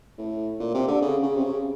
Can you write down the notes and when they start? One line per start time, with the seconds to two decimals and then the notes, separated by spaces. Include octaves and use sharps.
0.18 A2
0.60 A#2
0.74 C3
0.88 D3
1.02 C#3
1.23 C#3
1.36 C3
1.44 C#3